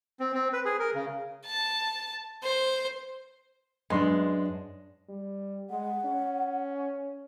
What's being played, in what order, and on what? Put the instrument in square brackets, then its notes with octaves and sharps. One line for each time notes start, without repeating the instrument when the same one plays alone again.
[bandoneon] C4
C4
B4
G#4
A#4
C#3
[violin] A5
C5
[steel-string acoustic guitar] F#2 D4 [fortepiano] G#3 B3 C6
[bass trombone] G3
[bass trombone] G#3 [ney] F#5
[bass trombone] C#4